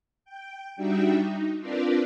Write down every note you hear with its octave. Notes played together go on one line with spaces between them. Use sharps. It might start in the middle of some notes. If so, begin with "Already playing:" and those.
G5
G3 D4 D#4 F#4 E5 G5
D#4
C4 D4 F4 A#4 B4 D5